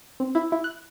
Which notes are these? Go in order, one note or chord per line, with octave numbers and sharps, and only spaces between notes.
C4
E4
E4
F#6